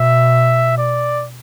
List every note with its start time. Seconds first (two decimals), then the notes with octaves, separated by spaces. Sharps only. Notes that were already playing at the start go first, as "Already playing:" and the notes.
Already playing: B2 E5
0.78 D5